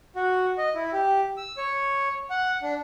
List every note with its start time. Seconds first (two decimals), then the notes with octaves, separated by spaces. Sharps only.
0.16 F#4
0.58 D#5
0.75 E4
0.93 G4
1.37 E6
1.57 C#5
2.30 F#5
2.63 D4